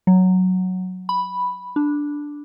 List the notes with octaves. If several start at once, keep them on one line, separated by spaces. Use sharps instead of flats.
F#3
B5
D4